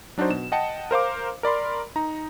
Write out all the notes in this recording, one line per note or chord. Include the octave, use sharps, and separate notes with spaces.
F#3 D4 D#4 F#4 C5
B2 E7
D#5 F#5 G5 A5 C#7
A#4 C5 F5 D6
A#4 D5 B5 C6
D#4 A#5